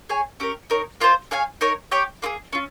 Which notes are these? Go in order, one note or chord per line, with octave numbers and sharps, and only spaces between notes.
G#4 C#5 G#5
C#4 G4 A#4
D#4 A#4 C#5
A#3 F4 C5
G#4 C#5 F5 G#5
D#4 A#4 C#5
G4 C#5 G5
A#3 F4 G#4
C#4 F4